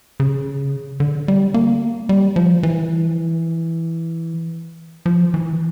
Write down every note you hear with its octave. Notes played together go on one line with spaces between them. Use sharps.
C#3
D3
G3
A#3
G3
F3
E3
F3
E3